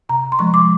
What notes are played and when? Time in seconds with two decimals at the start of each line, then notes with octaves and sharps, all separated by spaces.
0.09 C3 A#5
0.32 C6
0.39 F3 G#3 C#6
0.54 D6